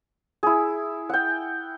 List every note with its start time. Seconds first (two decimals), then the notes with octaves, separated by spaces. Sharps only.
0.43 E4 G#4
1.09 F#5 G5